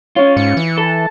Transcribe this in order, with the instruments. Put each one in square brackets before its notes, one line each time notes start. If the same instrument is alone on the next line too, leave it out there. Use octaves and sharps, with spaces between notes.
[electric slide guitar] C#4 F4 [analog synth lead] C#5
[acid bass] G#2 [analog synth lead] C#7
[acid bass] E3
[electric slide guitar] A4 [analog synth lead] A5